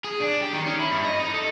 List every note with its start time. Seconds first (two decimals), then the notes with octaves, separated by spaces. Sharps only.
0.04 G#4
0.20 D4
0.41 G4
0.53 D#3
0.66 C#4
0.79 E4
0.91 G2
1.04 D#5
1.19 D#4
1.34 A4